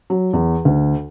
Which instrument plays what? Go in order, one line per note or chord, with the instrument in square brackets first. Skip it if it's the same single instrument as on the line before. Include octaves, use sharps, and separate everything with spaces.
[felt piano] F#3
E2
D2